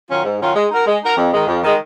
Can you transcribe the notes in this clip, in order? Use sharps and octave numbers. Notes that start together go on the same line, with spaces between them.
D#3 F#3 C#4 F4
G#2
D#3 F#3 C#4 F4
G#3
D#4 F#4 A#4
G#3
D#4 F#4 A#4
F2
D#3 G#3
F2
D#3 G#3